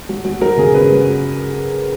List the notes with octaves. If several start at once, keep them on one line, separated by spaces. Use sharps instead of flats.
F#3
F#3
F#3 A#4
C#3 G#4
C#3 B4
F#3